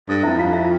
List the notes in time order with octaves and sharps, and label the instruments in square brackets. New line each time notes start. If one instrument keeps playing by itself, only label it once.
[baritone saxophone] G2 [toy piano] A4
[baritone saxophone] F2 [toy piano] E4 E5
[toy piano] F4 F5
E4 E5